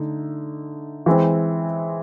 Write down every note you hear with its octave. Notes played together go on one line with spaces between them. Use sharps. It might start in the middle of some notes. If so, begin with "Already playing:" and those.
Already playing: D3 A3 D#4
E3 G#3 C4